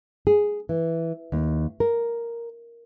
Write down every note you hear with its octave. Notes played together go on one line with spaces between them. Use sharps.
G#4
E3
D#2
A#4